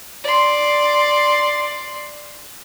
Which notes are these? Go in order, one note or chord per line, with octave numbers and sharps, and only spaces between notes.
D5 C6